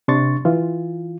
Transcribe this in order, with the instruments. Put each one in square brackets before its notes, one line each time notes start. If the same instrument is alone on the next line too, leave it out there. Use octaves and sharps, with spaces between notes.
[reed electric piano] C3 D4 C6 C#6 A6
E3 F4